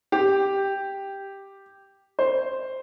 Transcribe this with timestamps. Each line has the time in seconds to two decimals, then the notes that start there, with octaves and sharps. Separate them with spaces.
0.12 G4
2.19 C5